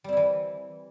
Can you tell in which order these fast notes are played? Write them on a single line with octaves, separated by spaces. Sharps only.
G3 C4 E4 E3